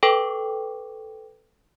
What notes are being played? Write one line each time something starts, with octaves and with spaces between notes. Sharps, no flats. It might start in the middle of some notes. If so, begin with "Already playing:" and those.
A4 B4 G5 C#6 D6